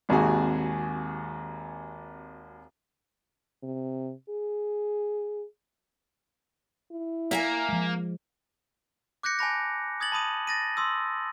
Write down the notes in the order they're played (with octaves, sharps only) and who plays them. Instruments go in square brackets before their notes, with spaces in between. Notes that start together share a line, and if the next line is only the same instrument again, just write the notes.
[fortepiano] G#1 D#2 C3 F#4 G#4 G#5
[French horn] C3
G#4
E4
[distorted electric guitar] A#3 [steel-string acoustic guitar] E5 F#5 G#5
[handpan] F3 G#3
[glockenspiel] D6 F#6 G6 A#6 C#7
G#5 A5 B5 A#6
D#6 G#6 A6 F#7
A5 B5 D#6 D#7
A6 A#6 D#7
C6 D#6 E6